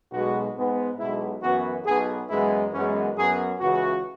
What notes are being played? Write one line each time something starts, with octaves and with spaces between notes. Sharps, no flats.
B1 B2 G#3 B3 F#4
G#2 G#3 B3
B1 B2 G#3 E4
F#2 E3 B3 F#4
B1 B2 B3 G#4
F#2 E3 G#3 B3 E4
F#2 E3 G#3 B3 C#4
F#2 F#3 B3 G#4
C#2 C#3 E3 F#4